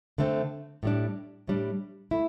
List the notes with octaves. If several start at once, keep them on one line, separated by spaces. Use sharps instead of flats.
D3 A3 C4
A2 G3 D4
A2 G3 D4
A3 E4